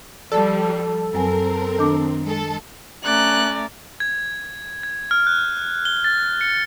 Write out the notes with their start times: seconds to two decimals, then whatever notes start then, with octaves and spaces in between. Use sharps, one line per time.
0.32 F3 G3 A4 D5 A5
1.13 F#2 F#3 C4 A#4 G#5
1.79 D#3 D4 D6
2.24 G#3 A4
3.04 A3 C#4 D5 A#5 F#6
4.00 G#6
4.83 G#6
5.11 F6
5.27 F#6
5.85 G7
6.04 A6
6.41 C#7